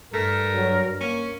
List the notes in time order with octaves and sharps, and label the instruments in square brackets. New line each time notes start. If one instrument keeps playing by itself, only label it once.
[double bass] G2 [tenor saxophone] A3 [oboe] A#4
[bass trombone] F#3
[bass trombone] A#3 [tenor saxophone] C#4